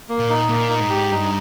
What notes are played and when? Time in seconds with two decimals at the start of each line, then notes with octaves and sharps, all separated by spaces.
0.09 A#3
0.19 A#2
0.30 D#4
0.49 A#2 A#3
0.69 D#4
0.80 G#2
0.89 G4
1.10 G2 D#4